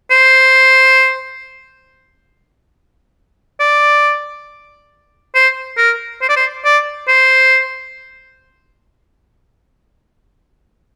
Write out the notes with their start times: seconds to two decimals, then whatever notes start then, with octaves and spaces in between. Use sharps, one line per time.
0.11 C5
3.60 D5
5.35 C5
5.78 A#4
6.22 C5
6.29 D5
6.37 C5
6.65 D5
7.08 C5